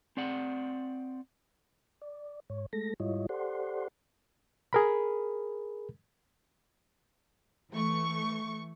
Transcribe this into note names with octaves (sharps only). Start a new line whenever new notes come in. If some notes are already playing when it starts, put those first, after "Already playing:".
C4 D5 F#5
D5
G#2 C#5
G#3 A3 A4 A#6
G#2 G3 E4 F4 C#5 D#5
G4 A4 C5 D5 F#5 C6
G#4 A#4 B5
E3 A3 C#6